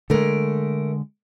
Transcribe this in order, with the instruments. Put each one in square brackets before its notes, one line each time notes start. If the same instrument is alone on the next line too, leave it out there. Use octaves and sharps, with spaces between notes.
[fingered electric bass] D3 G#3 [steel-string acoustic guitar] A3 A#4